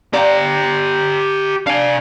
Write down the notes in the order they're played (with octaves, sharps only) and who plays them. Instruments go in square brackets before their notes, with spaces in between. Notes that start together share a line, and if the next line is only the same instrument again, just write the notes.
[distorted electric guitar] G4 A#5 [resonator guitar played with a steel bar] D5 F5 G5
[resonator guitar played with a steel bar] D4 [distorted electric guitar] F5 G#5